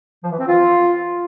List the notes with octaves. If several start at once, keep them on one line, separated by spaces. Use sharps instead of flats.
F3
E3
C4
F4